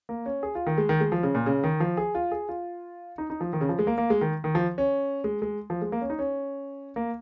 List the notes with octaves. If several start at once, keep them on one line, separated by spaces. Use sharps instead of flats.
A#3
C#4
G#4
F4
D#3
G#3
D#3
G#3
F3
C#3
A#2
C#3
D#3
F3
G#4
F4
G#4
F4
D#4
D#4
F3
D#3
C#3
F3
G#3
A#3
A#3
G#3
D#3
D#3
F3
C#4
G#3
G#3
F3
G#3
A#3
C#4
D#4
C#4
A#3